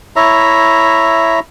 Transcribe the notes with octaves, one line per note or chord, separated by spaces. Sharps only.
E4 C#5 E5 A#5